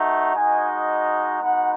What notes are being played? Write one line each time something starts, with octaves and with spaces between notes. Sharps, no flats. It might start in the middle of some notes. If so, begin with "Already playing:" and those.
Already playing: A3 D#4 F#4
G#3 D#4 F#4 G#5
G#3 B3 D#4 F#4 F#5